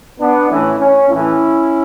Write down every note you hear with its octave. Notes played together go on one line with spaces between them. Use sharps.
B3 D4
A2 E3 A3 C#4 E4
C#4
A2 E3 A3 C#4 E4